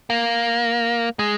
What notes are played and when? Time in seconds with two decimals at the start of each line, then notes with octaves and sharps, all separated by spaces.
0.10 A#3
1.19 G#3